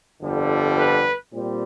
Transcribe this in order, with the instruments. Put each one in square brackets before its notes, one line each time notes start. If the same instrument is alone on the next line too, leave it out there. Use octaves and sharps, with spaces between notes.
[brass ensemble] G1 F2 D3 G3
B4
A#2 G3 C4